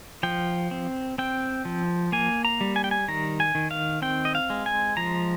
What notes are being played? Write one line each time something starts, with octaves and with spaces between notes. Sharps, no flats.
F3 G5
C4
C4 G5
F3
A#3 G#5
A#5
G3
G#5
G5
G#5
D#3 A#5
G#5
D#3
F5
C4 G5
D#5
F5
G#3
G#5
F3 A#5